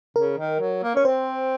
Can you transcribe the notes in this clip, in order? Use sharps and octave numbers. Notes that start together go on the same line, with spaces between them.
C#3 A#4
D#3
F#3
A#3
C#4 C#5
C4 C5